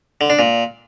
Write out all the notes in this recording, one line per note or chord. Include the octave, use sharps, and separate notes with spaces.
D3
D4
A#2